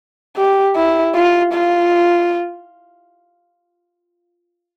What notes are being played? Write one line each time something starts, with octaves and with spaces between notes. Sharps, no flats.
G4
E4
F4
F4